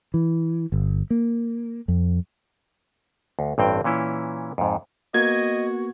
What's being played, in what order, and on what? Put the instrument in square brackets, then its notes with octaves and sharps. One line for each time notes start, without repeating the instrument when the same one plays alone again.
[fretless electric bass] E3
G1
A#3
F2
[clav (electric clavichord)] D2
A1 G2 C4 G5
A#2 E3 C#4 E4 C#5
F2 G#2
[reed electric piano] A#3 B3 [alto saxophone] F#4 [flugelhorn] D#5 [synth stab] G#6